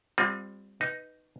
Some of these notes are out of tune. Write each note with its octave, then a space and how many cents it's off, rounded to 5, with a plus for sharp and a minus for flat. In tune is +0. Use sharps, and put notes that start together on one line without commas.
G3 +30 C4 +10 F4 +40
D#4 +0 B4 +0